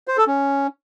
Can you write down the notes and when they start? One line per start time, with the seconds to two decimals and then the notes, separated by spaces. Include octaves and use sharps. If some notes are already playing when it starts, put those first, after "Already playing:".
0.08 C5
0.17 A4
0.27 C#4